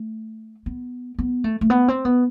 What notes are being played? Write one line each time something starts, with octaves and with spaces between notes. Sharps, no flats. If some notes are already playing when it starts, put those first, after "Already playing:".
Already playing: A3
B3
B3
A3
A3
B3
C4
B3